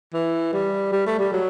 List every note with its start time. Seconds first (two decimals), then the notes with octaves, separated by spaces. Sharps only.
0.14 E3
0.53 G3
0.92 G3
1.06 A3
1.19 G3
1.32 F#3